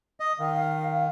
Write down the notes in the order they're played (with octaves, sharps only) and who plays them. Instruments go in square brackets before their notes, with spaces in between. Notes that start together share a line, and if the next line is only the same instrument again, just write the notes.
[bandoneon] D#5
[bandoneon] D#3 [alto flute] F5